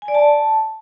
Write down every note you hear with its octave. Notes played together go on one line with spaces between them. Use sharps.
G#5
D5
A5